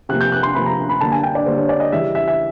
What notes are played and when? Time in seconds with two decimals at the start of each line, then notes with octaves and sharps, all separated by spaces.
0.09 C3 F3 A#3 F#6
0.21 G6
0.32 F#6
0.43 C6
0.55 C3 F3 A#3 B5
0.66 A#5
0.89 B5
1.01 D3 G3 A#3 A5
1.12 G#5
1.23 G5
1.35 D5
1.46 D3 G3 A#3 C5
1.57 C#5
1.69 D5
1.80 D#5
1.92 C#3 E3 G3 E5
2.15 E5
2.28 E5